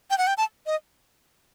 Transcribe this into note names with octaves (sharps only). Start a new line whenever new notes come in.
G5
F#5
G5
A5
D#5